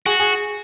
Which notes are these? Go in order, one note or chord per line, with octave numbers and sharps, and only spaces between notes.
F#4 G#4
G#4